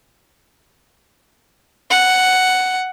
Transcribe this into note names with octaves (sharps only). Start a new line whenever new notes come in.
F#5